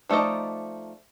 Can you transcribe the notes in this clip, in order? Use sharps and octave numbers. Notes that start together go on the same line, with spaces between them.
F3 A3 D#4 D5 D#5